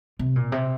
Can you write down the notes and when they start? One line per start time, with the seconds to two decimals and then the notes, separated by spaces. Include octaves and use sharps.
0.19 C3
0.36 A#2
0.52 C3